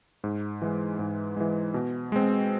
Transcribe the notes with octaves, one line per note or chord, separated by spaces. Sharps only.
G#2
E3 G#3
G#2
E3 G#3
B2
G#3 C4